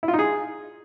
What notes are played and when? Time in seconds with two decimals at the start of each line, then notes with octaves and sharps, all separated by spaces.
0.03 E4
0.08 F4
0.13 D#4
0.19 G#4